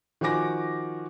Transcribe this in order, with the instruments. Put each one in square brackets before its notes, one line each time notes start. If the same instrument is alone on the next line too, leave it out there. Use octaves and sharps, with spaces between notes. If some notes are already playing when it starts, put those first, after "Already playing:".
[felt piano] D#3 F3 F#4 G#5 D6 A#6